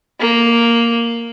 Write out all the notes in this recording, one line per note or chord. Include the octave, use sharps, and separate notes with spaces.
A#3